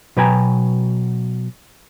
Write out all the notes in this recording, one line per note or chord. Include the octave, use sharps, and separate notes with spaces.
B2 F#3 B4 G5 G#5 A#5